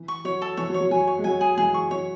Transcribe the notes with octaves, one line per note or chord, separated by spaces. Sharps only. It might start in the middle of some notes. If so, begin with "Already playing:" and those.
Already playing: E3
C#6
F#3 C#5
A4
E3 C#5
F#3
C#5
F#3
F#3 G#5
C#5
G#3
F#3 G#5
G#4
E3 G#3 G#4
C#6
F#3 C#5